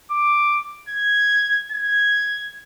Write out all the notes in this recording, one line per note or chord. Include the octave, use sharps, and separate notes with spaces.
D6
G#6
G#6